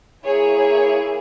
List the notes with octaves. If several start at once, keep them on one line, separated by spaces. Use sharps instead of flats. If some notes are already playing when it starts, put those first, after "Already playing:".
A#3 E4 G#4 C#5
C#5